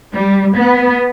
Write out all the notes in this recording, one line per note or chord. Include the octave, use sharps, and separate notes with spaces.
G3
B3